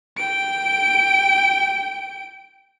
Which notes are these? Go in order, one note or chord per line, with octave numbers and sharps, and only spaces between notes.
G5 D7